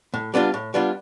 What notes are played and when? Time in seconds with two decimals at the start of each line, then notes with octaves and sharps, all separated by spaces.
0.14 A2
0.34 G3 B3 D4 F4
0.54 A2
0.74 G3 B3 D4 F4